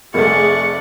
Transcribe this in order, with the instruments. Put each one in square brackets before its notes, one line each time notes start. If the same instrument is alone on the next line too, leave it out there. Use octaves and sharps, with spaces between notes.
[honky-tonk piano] F1 A3 [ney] G#4 [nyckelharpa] D5 F#5 [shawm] C#6